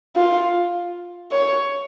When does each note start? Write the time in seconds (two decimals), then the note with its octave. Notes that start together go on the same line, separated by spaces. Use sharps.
0.16 F4
1.32 C#5